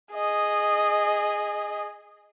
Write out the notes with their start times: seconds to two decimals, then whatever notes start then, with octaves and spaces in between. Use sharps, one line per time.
0.13 G#4 D#5